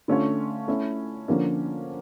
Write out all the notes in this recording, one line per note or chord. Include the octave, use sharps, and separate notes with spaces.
D3 A3 C#4 F4 C#5
A3 C#4 E4
D3 F3 A#3 C#4